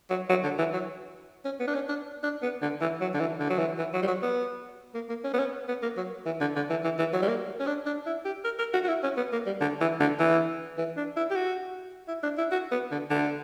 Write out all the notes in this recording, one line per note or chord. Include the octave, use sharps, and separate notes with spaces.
F#3
F#3
D3
E3
F#3
C#4
B3
D4
C#4
D4
D4
B3
D3
E3
F#3
D3
E3
D3
F#3
E3
E3
F#3
G3
F#3
B3
A#3
A#3
C#4
B3
C#4
B3
A#3
F#3
E3
D3
D3
E3
E3
E3
F#3
G3
A#3
C#4
D4
D4
E4
G4
A#4
A#4
F#4
F#4
E4
C#4
B3
A#3
G3
D3
E3
D3
E3
E3
D4
E4
G4
F#4
E4
D4
E4
F#4
B3
D3
D3